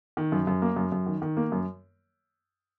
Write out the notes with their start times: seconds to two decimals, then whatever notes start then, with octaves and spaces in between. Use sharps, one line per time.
0.17 D#3
0.32 F#2
0.47 F#2
0.62 A#3
0.76 F#2
0.92 F#2
1.06 D#3
1.22 D#3
1.37 A#3
1.52 F#2